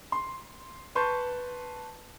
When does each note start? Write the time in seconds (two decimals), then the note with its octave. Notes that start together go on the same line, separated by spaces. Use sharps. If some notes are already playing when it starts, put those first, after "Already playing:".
0.12 C6
0.95 B4 A5 C6 C#6 G6